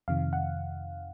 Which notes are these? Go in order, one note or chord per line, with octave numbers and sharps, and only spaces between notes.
F2 C3 D#3 F5
F#5